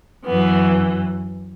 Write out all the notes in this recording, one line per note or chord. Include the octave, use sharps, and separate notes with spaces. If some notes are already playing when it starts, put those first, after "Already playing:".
F#2 E3 B3